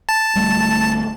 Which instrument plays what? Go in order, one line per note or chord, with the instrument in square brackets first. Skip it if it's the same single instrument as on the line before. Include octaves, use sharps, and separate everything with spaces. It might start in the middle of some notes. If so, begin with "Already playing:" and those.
[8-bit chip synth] A5
[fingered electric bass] D1 G3 A3